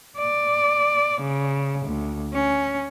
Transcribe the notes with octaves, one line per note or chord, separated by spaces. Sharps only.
D5
C#3
D2
C#4